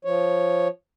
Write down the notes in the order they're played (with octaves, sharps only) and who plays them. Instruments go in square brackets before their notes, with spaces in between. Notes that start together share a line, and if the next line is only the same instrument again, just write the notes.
[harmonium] F3 C#5